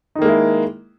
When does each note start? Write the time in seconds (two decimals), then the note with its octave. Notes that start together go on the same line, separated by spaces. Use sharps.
0.15 D#4
0.19 D#3
0.22 A#3
0.25 G#3
0.28 E4